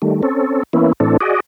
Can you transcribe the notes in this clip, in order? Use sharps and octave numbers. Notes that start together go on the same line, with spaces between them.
D#3 G3 A3
C4 C#4 A4
E3 A#3 B3 C#4 E4
A2 E3 C4 D4 A4
F#4 G#4 D5 D#5